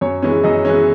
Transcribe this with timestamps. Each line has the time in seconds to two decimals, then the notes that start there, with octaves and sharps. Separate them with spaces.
0.01 F#2 C#5
0.22 E3 G#3 C#4
0.44 F#2 D#5
0.65 E3 G#3 C#4